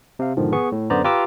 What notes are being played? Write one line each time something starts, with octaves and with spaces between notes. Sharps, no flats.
C3 F5
G#2 B2 D3 D#3 F3
B3 G#4 C#6
A2
F#2 D3 B3 C5 D5 A#5
F4 G4 B4 A#5 D6 E6